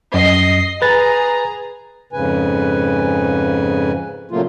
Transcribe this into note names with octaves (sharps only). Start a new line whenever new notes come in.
F#2 D#5 C7
G#4 B4 A#5 A6
F2 G#2 C#3 B4 G#5
A#2 C#3 F#3 A3 A#3 F4